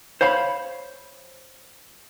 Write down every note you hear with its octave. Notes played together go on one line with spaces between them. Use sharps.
C5 C#5 F5 B5